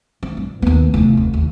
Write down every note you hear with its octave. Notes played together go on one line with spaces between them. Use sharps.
C4
G2
D#2 B3
F1 E3
D#2
D#2